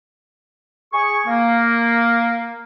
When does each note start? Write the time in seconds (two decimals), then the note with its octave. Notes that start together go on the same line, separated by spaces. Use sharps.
0.93 G#4 C#6
1.27 A#3